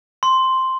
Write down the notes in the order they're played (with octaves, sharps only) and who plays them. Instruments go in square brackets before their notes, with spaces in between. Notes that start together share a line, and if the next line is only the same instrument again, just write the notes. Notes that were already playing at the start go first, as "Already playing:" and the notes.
[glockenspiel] C6